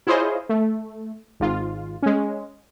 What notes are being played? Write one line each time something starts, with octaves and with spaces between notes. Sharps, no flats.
E4 F4 G#4 C5 C#5 D#5
A3
G#1 G#2 F4
G#3 C#4